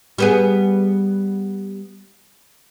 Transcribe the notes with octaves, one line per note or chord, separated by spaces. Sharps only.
G3 B3 G#4